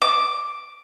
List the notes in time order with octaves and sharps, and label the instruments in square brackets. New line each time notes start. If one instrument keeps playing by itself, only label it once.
[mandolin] D6